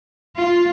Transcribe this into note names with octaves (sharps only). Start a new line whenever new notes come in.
F4